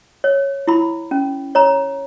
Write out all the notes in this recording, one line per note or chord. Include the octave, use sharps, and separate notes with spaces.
C#5
E4 B5
C#4
C#5 A#5